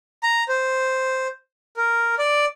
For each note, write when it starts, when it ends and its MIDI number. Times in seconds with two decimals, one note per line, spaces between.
0.23 0.44 82
0.49 1.27 72
1.77 2.15 70
2.19 2.45 74